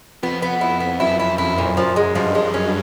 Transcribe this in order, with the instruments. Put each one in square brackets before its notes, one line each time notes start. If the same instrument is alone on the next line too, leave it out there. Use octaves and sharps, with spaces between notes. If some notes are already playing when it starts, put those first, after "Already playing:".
[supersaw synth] F2 [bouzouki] B3
[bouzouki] B3
E4
B3
[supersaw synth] F#2 [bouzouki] E4
[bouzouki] E4
[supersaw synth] F2 [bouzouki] E4
[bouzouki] A#2
[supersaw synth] F#2 [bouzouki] F3
[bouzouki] G#3
[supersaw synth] G2 [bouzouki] F3
[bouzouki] G#3
C#4